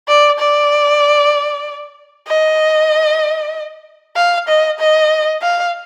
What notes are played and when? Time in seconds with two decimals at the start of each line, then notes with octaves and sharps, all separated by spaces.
0.08 D5
0.39 D5
2.27 D#5
4.16 F5
4.48 D#5
4.79 D#5
5.42 F5